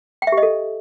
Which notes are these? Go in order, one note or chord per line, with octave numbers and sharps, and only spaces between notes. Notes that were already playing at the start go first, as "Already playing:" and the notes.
G5
E5
G4
D#5
A4